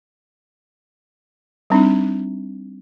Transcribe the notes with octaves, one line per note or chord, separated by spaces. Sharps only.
G3 C4 D4 D#4